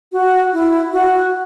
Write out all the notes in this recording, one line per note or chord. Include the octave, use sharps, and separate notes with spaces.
F#4
E4
F#4